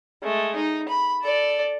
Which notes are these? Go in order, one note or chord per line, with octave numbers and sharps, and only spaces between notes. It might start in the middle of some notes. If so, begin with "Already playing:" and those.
G#3 A3
D#4
B5
A4 D5